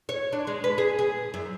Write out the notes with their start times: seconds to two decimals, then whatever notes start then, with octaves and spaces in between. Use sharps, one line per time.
0.09 C#5
0.33 D4
0.47 G#3
0.64 B4
0.78 G#4
0.99 G#4
1.34 F#2